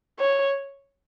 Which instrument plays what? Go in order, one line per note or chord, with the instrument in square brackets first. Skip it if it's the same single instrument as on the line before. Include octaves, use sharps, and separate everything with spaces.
[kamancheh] C#5